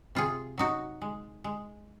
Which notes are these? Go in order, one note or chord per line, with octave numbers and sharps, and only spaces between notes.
C3 F4 G#4
F#3 D#4 F#4
G#3
G#3